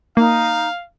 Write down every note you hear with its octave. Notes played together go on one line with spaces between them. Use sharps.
A#3 D#4 F5